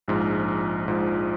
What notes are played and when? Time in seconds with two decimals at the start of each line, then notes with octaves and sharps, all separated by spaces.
0.08 A#1 G#2 F3
0.87 A#1 G#2 F3